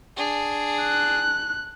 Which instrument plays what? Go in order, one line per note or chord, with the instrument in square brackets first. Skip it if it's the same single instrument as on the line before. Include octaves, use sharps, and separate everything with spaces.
[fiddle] D4 G#4
[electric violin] F#6